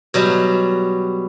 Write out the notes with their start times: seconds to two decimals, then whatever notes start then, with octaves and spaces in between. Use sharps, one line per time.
0.14 B2 F#3 G3